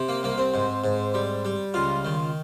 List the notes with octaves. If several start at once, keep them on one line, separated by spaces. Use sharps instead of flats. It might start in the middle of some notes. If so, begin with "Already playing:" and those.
Already playing: C3
A#3
C2 A#3
C4
G#2
G#2
G3
G3
C#2 F4
D#3